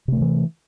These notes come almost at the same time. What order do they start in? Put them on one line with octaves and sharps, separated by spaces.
C3 A3 D#3 E3